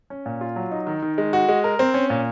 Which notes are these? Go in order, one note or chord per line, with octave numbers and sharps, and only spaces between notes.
C#4
A#2
F4
F#3
D#4
D#3
D#3
G#3
F#4
G#3
A#4
C4
C#4
A#2